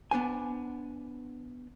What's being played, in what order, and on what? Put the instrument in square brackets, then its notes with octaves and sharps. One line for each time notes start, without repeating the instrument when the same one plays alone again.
[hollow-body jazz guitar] B3 D4 C5 G#5